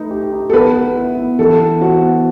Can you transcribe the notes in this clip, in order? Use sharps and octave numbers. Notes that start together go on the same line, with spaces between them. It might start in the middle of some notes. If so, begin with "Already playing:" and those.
Already playing: A3 D#4 B4
G4
D#4
A4
B3 B4
B3
E4
B3
E3 A4
B3
F#4 C5
B3